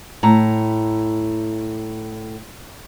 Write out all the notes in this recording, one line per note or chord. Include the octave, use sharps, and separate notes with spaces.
A2 A#5